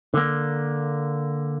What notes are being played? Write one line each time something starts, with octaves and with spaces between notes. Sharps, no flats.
D3 A#3